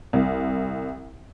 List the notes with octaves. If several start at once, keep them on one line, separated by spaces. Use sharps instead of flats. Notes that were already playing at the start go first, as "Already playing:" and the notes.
C2